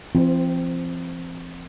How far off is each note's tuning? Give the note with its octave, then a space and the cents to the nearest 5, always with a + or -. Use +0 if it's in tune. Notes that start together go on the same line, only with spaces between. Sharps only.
F3 -40 C4 +0